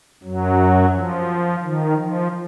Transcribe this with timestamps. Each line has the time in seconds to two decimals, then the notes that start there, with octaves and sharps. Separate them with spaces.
0.23 F#2 F#3
0.93 F3
1.63 D#3
1.97 F3